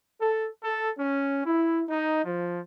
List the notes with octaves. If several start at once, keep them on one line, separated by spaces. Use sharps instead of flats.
A4
A4
C#4
E4
D#4
F3